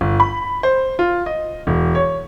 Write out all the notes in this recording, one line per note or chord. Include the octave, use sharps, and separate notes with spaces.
G1
B5
C5
F4
D#5
E1
C#5